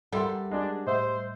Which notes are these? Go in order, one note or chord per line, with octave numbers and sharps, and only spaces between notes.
G3 A4 A#4 E5 F#5 C6
G#3 D4
A2 C5 D#5 E5